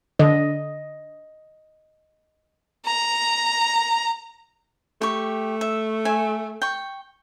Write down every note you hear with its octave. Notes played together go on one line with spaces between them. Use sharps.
D3 D#5
A#5
A3 G4 C#6
E5
E5 G#5
G5 C#6